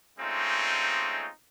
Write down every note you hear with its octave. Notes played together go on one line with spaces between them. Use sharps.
G#3 A3 C4 C#4 D#4 F4